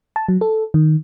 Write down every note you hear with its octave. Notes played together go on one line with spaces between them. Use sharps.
A5
F#3
A4
D#3